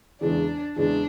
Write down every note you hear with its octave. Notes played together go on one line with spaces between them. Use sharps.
E2 C#3 E3 G#3 D4
E2 C#3 E3 G#3 D4